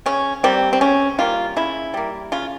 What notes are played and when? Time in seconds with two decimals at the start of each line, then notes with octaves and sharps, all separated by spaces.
0.06 C#3 C#4
0.43 G3 A#3 C4
0.73 C4
0.81 C#3 C#4
1.18 G3 A#3 F4
1.56 C#3 E4
1.94 G3 A#3
2.32 C#3 F4